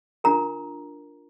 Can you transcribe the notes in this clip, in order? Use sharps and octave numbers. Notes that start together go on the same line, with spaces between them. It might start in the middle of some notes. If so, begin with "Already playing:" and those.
D4 F4 A#4 A#5